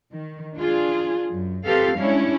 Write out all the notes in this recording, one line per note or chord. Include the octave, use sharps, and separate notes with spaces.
D#3
D4 F4 G#4
F#2
C4 F4 G4 A4 B4 F5
G3 G#3 C#4 D4 E4 C#5